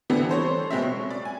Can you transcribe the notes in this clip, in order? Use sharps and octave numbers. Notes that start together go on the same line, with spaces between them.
D3 E3 G3 B3 C4
A4 C5 C#5
B2 G#3 C4 E5
C#6
D5
G#5